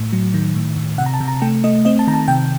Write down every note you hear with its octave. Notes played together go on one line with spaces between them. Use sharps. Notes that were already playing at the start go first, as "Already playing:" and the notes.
Already playing: A2
F#3
D#3
A2
A2
C3 F#5
A#5
A5
C3
A#5
A3 G5
A3 D#5
C4 D#5
A5
D#3 A#5
A5
C3 G5